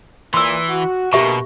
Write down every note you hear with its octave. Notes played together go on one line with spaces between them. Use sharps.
A#2 E3 C6 E6
F#4
B2 D3 G#3 A#3 G4 E5 C#6